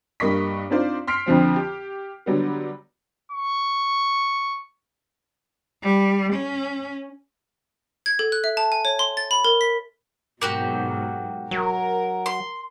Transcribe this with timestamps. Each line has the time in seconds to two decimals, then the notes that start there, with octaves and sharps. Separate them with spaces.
0.20 G2 A#3 D#5 C#6 B6
0.70 C4 D4 D#4 F4 C5 D5
1.07 C6 F6 B6 C7 D7
1.26 F2 D3 F3 C4
1.56 G4
2.26 D3 F#3 G3 B3
3.32 C#6
5.83 G3
6.32 C#4
8.06 G#6
8.19 A4
8.32 F#6
8.44 E5
8.57 A5
8.72 G#5
8.85 C#5
8.99 C6
9.17 A6
9.31 B5
9.45 A#4
9.61 B6
10.42 G#2 B2 F#3 A#3 F#4 G4
11.51 F#3 A#4
12.26 C6